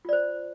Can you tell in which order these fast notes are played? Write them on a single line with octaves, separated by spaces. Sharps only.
F4 D5 C5